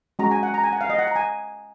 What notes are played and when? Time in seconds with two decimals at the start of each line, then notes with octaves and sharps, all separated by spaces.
0.19 G#3 C#4 F#4 A#5
0.31 G#5
0.43 F#5
0.54 A#5
0.64 G#5
0.73 F#5
0.81 F5
0.90 D#5
0.99 F#5
1.07 A#5
1.16 G#5